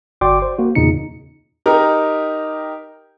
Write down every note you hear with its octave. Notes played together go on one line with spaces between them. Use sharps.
G1 F#4 D5 G5 C6 D6
C5
A#3 F#4
E2 A#2 C#3 D#4 C#7
D#4 G4 A#4